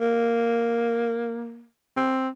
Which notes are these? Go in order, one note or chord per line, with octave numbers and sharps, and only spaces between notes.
A#3
C4